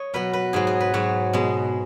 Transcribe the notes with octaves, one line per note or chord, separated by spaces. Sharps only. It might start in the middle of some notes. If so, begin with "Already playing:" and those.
Already playing: C#5 D#5
B2 F#3 B4
B4
G#2 F#3 G#4
G#4
B4
G#2 F#3 C#5
B2 G#3